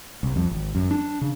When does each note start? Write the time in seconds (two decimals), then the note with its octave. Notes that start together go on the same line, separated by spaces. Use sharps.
0.23 C2
0.36 F2
0.51 G#1
0.75 F#2
0.91 D4
1.21 C#3